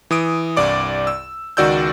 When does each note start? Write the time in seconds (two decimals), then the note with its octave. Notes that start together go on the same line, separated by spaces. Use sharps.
0.11 E3 D#6 D7
0.57 C2 G2 D5 D6
1.07 E6
1.57 C#2 D#3 F#4 D5 E6 G6